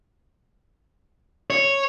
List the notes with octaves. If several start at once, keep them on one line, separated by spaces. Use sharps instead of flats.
C#5